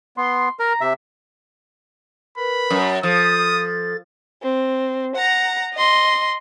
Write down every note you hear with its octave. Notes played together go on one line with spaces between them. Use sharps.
B3 C6
A#4 A#5
C3 E5
A#4 B4 B5
F#2
F3 A4 D#6 A6
C4
F#5 A#5
D#5 C6